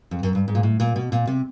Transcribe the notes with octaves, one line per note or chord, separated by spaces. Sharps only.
F2
F#2
G2
G#2
A#2
A2
A#2
B2
A#2
C3